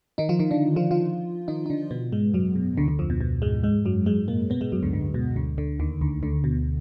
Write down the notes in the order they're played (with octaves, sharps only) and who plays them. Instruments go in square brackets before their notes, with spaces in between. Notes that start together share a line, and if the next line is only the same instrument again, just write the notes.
[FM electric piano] D#3 D#4
F3 F4
D#3 D#4
D3 D4
F3 F4
F3 F4
D#3 D#4
D#4
D3 D4
B2 B3
G#2 G#3
F#2 F#3
B2
D2 D3
D2 D3
F2 F3
B2
B2
G#2 G#3
G#2 G#3
F#2 F#3
G#2 G#3
A#2 A#3
B2 B3
G#2 G#3
F#2 F#3
D2 D3
D2 D3
B2
D2 D3
D2 D3
D#2 D#3
D2 D3
D2 D3
B2